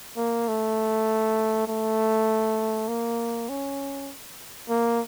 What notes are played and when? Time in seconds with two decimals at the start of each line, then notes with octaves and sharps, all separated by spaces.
0.17 A#3
0.48 A3
1.67 A3
2.88 A#3
3.49 C#4
4.69 A#3